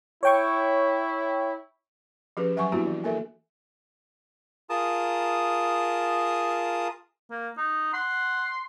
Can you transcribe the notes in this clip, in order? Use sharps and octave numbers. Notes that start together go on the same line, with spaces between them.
E4 C#5 G5 C#6
F3 C#4 G4 G#4 B4
F#3 E5 F#5 G#5 C#6
A#3 B3 D4 E4 F#4 G4
E3
A#3 A4 A#4 E5
F4 G#4 A#4 A5 D#6
A#3
D#4
F#5 C6